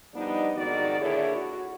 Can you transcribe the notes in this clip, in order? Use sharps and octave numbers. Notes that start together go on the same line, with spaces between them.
F3 G3 B3 D4 D#4
F2 G#2 D#3 F#4 D5
A#2 D3 E4 G#4 C#5
F#4